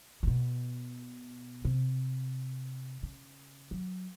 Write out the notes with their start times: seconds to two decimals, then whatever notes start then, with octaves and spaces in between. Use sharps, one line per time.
0.23 C3
0.27 B2
1.65 C3
3.03 C#3
3.71 F#3